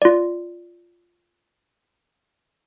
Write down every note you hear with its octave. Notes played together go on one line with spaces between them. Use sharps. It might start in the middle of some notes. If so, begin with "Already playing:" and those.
F4 D5